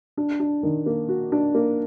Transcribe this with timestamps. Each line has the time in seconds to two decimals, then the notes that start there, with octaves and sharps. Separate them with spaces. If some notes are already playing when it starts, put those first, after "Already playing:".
0.17 D4
0.40 D4
0.63 D#3
0.86 A#3
1.09 F#4
1.32 D4
1.55 A#3